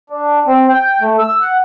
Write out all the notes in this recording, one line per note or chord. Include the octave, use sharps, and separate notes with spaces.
D4
C4
G5
A3
E6
F#5